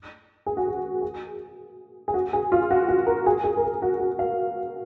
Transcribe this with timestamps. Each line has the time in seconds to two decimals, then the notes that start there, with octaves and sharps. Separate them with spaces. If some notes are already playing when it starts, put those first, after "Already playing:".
0.46 G#4
0.57 F#4
0.67 G#4
1.02 G#4
2.08 G#4
2.14 F#4
2.33 G#4
2.52 F4
2.71 F#4
2.89 F#4
3.07 A#4
3.26 G#4
3.44 G#4
3.57 A#4
3.64 G#4
3.82 F#4
4.00 F#4
4.19 F5